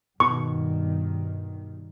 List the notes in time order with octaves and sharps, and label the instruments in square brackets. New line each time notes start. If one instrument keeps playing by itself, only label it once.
[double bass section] G2 D#3 [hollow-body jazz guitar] B2 [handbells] C#6